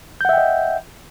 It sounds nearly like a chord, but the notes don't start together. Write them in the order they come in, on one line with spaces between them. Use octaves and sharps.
G6 F#5 E5 G5 D#5